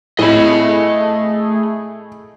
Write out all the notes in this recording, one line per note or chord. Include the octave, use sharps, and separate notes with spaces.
A2 A3 G#4 D#5 B5